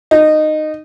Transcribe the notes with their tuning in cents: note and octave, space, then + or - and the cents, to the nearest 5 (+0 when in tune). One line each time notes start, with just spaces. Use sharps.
D#4 -15